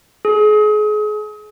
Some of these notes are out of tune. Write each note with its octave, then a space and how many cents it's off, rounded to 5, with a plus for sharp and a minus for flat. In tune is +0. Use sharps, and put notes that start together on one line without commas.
G#4 +35